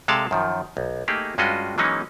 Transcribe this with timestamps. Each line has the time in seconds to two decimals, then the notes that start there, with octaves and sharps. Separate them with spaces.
0.08 C3 G#3 A4 D5 F5 A5
0.31 F#2 D#3 F3
0.77 B1
1.08 A3 A#3 D#4 G4 G#4
1.38 G2 G#3 C#4 F4 F#4 D#5
1.78 E3 F#3 G#3 A#3 C#4 D#4